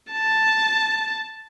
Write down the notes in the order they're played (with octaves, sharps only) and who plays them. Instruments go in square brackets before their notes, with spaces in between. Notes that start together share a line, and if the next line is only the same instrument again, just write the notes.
[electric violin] A5